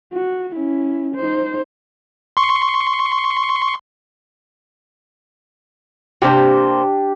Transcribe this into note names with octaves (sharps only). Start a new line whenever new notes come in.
F#4
C#4 E4
D#4 C5
C6 C#6
C3 A#3 D4 G4 C5